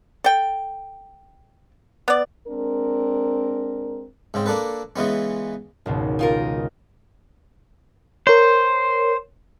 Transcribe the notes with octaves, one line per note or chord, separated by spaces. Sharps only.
A4 G5
B3 D5
G#3 C4 D4 A#4
G#2 C#3 C4
A#3 D4 A4 B4
C#3 E3 G#3 B3 C#4
G#1 C#2 B2
D#4 F4 A#4
A#4 C5 C#5